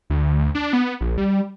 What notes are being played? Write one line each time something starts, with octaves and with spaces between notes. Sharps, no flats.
D2
D4
B3
A#1
G3